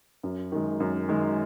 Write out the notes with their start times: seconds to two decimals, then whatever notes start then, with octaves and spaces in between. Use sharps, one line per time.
0.23 F#2
0.52 D#3 G#3
0.80 F#2
1.09 D#3 G#3